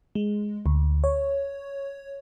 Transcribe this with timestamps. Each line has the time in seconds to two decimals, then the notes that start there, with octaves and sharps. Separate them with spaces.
0.15 G#3
0.66 D2
1.04 C#5